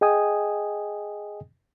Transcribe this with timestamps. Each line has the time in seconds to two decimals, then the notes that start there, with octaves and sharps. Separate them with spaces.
0.01 G#4 D#5 G5 G#5 D#6